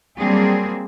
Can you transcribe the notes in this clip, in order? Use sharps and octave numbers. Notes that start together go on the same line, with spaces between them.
F#3 G3 A#3 C4 D4 G#4